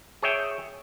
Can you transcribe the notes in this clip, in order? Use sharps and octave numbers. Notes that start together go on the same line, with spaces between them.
G#4 C#5 E5 G5